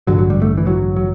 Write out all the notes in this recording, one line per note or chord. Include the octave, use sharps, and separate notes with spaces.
A1 G2 D3 F#3
F#3
G3
A3
E3
F#3
F#3